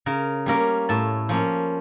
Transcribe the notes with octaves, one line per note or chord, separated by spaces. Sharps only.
C#3 A#4
G3 A#3 C#4 A#4
A2 A5
F3 A#3 C#4